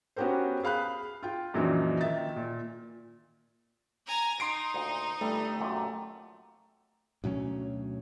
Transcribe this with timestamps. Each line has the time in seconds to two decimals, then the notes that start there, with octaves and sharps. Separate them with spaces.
0.16 B3 C#4 F#4 G4 A#4 C5
0.63 G#4 F5 B5 F#6
1.23 F4 G5
1.54 F#2 A#2 E3 F3 D4 D#4
2.01 D#3 E5 A6
2.36 A#2
4.07 G#5 A#5
4.40 D#4 C6 C7 D7
4.74 D2 A#2
5.21 G1 G3 A3 E4
5.61 F#2 A#2 G4
7.24 D2 B2 F#3 C#4